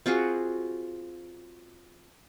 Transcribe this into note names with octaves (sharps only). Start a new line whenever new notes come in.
C4 F4 F#4 G#4